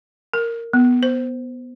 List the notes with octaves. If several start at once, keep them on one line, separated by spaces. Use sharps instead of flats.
A#4
B3
C5